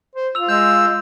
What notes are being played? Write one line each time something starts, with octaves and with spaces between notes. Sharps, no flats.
C5
F4 E6 F7
G#3 E6 G6